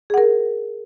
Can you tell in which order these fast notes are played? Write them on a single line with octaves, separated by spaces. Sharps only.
G#4 F#5 A#4